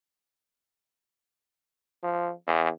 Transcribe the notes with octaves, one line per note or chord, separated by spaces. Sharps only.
F3
E2